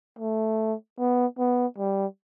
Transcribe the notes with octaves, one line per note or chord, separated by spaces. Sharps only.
A3
B3
B3
G3